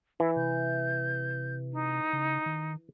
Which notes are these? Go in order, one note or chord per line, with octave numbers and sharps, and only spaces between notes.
E3 E4
C3 G6
D#4
C#3
D#3